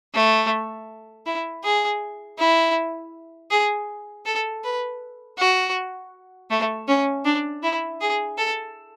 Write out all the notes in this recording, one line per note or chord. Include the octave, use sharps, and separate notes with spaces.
A3
E4
G#4
E4
G#4
A4
B4
F#4
A3
C#4
D4
E4
G#4
A4